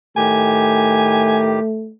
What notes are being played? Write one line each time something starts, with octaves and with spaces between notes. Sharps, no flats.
A2 D#3 A3 G4 G#5